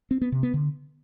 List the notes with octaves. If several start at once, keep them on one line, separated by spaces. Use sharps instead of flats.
C4
B3
C3
B3
D3